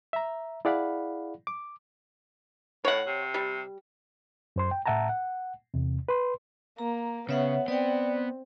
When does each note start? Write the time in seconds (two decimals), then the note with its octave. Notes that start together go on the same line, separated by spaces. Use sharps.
0.13 E5 A#5
0.65 E4 G#4 D5 F5 F#5 B5
1.47 D6
2.85 A2 C#5 F#5
3.07 C3
3.34 G3
4.56 F#2 C5 C6
4.71 G5
4.86 A2 E5 F#5 A5 A#5
5.09 F#5
5.74 E2 C3
6.09 B4 C6
6.78 A#3 A#5
7.29 C#3 B3 C#5 E5 F#5
7.68 B3 C4 D5 G5